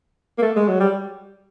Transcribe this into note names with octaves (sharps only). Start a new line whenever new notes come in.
A#3
A3
G#3
F#3
G3